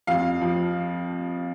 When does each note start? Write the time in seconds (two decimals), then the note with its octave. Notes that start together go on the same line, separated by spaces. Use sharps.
0.07 F2 F5
0.41 F3